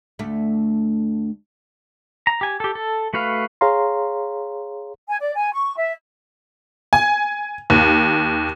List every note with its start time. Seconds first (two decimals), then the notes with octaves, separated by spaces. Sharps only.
0.19 D2 A3
2.27 A#5
2.41 G4 G#5
2.60 G4 A4
2.75 A4
3.14 A3 F#4 B4 F5
3.61 G#4 C#5 F5 A#5 C6
5.08 G#5
5.20 D5
5.35 G#5
5.53 C#6
5.77 E5
6.93 G#5
7.70 D#2